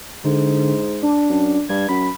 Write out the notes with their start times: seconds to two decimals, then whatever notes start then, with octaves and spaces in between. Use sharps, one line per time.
0.24 G#2 D3
1.02 D4
1.30 F#2 D4
1.69 G2 G#6
1.89 F#2 B5